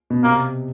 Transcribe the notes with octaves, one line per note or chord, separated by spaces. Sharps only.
B2
C3 A#3